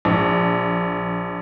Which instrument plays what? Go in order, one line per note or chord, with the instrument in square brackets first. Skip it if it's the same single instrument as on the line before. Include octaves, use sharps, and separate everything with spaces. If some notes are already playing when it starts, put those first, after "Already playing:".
[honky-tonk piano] A#1